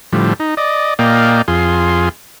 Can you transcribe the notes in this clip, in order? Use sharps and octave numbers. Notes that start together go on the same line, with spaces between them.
A2 D3 F3 G3
D#4
D5 D#5
A#2 A#3 D5 D#5 F5 G5
F2 F4 G#4 C6